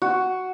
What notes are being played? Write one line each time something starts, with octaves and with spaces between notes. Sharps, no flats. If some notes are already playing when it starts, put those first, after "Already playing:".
F#4